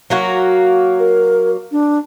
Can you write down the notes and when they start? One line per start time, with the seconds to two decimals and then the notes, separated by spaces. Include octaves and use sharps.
0.10 F#3 A#3 F#4
0.99 A#4
1.72 D4